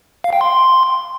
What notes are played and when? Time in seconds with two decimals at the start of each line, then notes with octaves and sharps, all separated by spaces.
0.24 F5
0.33 G5
0.41 C6